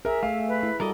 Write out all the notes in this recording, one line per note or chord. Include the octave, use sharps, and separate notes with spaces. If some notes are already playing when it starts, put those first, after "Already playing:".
G#4 A#4 E5
A3 F5
B4
E4
G3 F#4 A4 A#4 D5 D#5